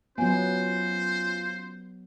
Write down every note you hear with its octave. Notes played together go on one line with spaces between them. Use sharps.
F#3 B3 C#4 F4 C5 G#5